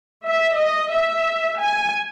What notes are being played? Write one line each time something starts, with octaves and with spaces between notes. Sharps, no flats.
E5
D#5
E5
G#5